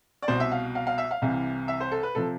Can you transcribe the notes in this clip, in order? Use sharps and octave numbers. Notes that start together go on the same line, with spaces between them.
D5
C2 B2 C5
E5
F5
F5
F5
E5
F5
C2 C3 E3
E5
C5
A4
B4
C3 F3 A4